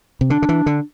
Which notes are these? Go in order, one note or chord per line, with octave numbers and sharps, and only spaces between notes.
C3
D3 D4
D3
E3
D3